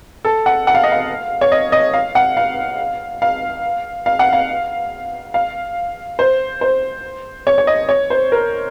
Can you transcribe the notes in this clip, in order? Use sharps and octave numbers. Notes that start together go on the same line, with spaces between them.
A4
F#5
F#5
F5
D#5
F5
C#5
D#5
D#5
F5
F#5
F5
F5
F5
F#5
F5
F5
C5
C5
C#5
C#5
D#5
C#5
C5
A#4